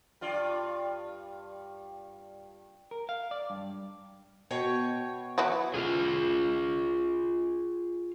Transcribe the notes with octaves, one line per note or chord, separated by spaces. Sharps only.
G2 F4 D5
A#4
F5
D5
G2
B2 C#5 G5
E3 F#3 E4
F4 G#4